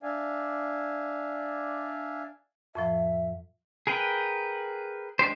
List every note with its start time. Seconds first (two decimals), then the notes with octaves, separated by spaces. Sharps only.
0.03 D4 D5 E5 F5 G#5
2.75 F2 A2 F3 E5
3.87 G#4 A#4 B4 G5
5.19 G#3 D4 G4 C5